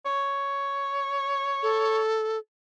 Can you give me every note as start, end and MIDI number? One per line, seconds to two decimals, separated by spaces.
0.05 1.99 73
1.63 2.38 69